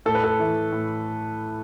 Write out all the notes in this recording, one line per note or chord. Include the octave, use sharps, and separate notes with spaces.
A2 A4
B4
A4
E3 A3
A2